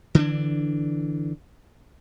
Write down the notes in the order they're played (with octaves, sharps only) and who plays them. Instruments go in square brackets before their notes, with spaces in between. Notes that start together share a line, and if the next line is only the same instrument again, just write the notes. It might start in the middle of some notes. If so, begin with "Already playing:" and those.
[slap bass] D3 E3 G3 D4